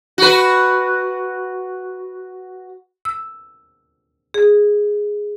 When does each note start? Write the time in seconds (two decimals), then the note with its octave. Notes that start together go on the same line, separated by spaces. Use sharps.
0.18 F#4 B4
3.05 E6
4.34 G#4